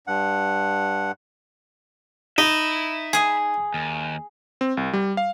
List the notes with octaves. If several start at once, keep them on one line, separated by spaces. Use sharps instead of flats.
G2 F#5
D#4 E5 B5
G#4 G#5
D#2
C4
C2
G3
F5